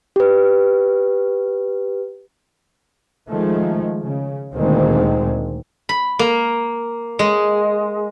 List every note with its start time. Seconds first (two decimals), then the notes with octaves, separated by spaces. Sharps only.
0.16 G4 B4
3.30 D#3 F3 G#3 A3
4.03 C#3
4.53 D2 A#2 D3 D#3 G#3 C4
5.89 B5
6.19 A#3
7.19 G#3